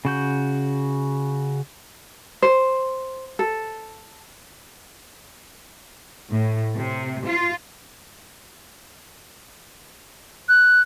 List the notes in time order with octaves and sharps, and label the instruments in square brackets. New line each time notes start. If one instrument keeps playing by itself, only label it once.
[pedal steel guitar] C#3 F#4 G6
[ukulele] C5
A4
[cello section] A2
C3
F4
[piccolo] F#6